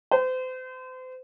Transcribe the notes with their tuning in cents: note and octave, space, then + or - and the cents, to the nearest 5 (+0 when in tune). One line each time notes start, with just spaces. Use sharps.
C5 -35